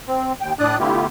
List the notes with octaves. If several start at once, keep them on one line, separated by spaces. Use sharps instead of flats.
C4
D#2 G5
A2 D4 D5 D#6 F#6
D3 A3 B3 E4 F4 G4